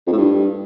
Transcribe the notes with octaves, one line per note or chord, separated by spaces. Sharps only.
F2
A2
G2